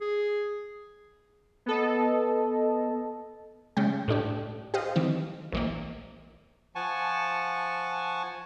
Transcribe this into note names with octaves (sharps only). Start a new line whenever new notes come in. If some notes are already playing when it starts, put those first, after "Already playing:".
G#4
B3 A4 D#5
C#3 G3 G#3 G5
A2 A3 D4 G4
G4 C5 D#5 F5
D#3 E3 C4
A#1 E3 A#3
F3 F#5 G#5 A5 C#6